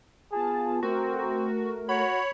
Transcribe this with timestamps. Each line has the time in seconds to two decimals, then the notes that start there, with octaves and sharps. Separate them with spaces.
0.32 B3 F4 G#4 A5
0.83 A3 C4 F#4 A#4
1.89 F#4 C#5 B5